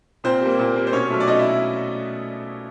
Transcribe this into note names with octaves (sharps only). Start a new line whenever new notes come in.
A#2 C4 C5
G3 A#3
A#2
G3 A#3
C5
B2 C#4 C#5
F#3 A3
D5
B2 D#4 D#5
E4 E5